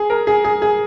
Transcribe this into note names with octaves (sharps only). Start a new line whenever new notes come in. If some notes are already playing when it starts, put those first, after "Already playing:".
Already playing: G#4
A#4
G#4
G#4
G#4